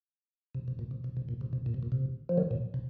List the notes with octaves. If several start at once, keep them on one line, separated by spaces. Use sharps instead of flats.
C3
C3
A#2
C3
C3
C3
A#2
C3
C3
A#2
C3
A#2
C3
F3
D#3 F#3
A#2
C3